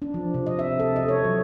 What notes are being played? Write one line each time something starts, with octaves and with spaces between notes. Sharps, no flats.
D4
F3
C3
D#5
E5
A4
D#5
C#5
F#3